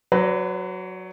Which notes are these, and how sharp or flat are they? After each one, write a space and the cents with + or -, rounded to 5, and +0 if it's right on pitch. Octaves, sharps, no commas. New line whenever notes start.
F#3 +0 B4 +35 D5 -30